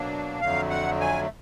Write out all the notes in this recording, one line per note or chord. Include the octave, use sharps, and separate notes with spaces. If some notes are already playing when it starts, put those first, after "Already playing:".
Already playing: B2 F#3 A#3 D4
F2 D3 F#3 A3 F5
F#5
G#5